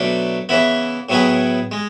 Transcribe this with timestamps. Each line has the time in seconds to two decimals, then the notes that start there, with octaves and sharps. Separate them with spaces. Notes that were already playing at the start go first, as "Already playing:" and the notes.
Already playing: B2 F#3 A3 D4
0.49 C#3 E3 B3 E4
1.09 A2 F#3 B3 E4 G#4
1.71 G#3